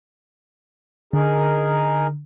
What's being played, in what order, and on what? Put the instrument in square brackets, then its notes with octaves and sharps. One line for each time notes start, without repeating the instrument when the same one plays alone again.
[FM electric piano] D3 [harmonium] D#4 G#4 A#4